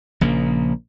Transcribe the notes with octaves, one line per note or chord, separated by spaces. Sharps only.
A#1 C#3 A#3